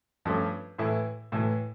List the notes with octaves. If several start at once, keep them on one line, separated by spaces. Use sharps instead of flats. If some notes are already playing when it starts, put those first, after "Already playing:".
G2 F3 A3 C#4
A2 E3 A3 E4
A2 E3 A3 E4